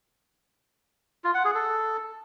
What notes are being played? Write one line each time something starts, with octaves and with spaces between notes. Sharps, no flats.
F4
F#5
G#4
A4